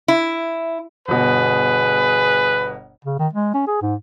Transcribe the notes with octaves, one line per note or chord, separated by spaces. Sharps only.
E4
G1 B2 G#4 B4
C#3
D#3
G#3
C#4
G#4
G#2